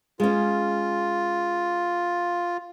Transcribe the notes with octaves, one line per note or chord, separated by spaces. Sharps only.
G#3 C#4 F4